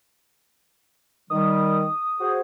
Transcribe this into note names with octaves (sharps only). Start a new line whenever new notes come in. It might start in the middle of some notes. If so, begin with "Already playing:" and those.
D#3 G3 D#6
F#4 G#4 C5